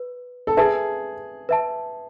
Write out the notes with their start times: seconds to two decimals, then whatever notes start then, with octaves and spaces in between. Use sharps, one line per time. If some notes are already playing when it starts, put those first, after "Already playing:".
Already playing: B4
0.47 A4
0.57 G#4 B4 E5 A5
1.49 B4 E5 A5